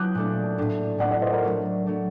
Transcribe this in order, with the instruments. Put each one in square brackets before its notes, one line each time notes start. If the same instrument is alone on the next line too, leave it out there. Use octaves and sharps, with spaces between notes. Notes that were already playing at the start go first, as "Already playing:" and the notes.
Already playing: [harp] F#3 [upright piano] D6 D#6 F#6 G6
[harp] A#2 A3 D4
A2 A3 D4
[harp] A2 A3 D4 [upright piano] D5 F#5
[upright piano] D5 F#5
C5 D#5
A#4 D5
[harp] F#3 A3 D4
F#3 A3 D4